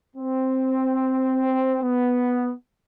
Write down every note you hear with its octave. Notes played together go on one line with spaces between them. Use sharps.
C4
B3